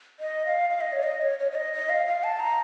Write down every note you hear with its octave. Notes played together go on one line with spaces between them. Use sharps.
D#5
F5
F5
D#5
C#5
D#5
C#5
C#5
C#5
D#5
D#5
F5
F5
A5
A#5